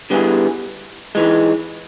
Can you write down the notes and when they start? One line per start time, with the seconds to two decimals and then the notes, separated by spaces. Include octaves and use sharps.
0.10 D3 G3 B3 E4 G#4
1.15 G#2 E3 G#3